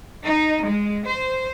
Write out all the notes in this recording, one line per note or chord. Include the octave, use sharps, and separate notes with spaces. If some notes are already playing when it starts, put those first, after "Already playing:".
D#4
G#3
C5